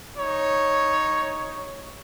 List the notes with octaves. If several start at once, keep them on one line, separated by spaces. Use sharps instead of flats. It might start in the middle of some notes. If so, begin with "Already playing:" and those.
D#4 C#5